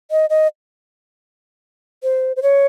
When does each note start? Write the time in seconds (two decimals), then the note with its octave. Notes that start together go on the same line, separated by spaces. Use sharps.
0.11 D#5
0.30 D#5
2.03 C5
2.36 C5
2.42 C#5